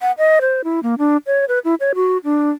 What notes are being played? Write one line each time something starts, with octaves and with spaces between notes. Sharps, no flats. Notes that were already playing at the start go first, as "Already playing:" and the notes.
F#5
D#5
C5
E4
A#3
D4
C#5
B4
E4
C#5
F#4
D4